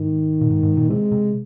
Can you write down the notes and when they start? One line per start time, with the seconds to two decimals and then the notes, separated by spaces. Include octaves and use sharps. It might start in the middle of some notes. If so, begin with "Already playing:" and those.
Already playing: G#2 D#3
0.41 A#2
0.50 G#2
0.63 G#2
0.77 A#2
0.90 C3 G#3
1.12 C3